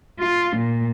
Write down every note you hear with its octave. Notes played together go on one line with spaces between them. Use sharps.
F4
A#2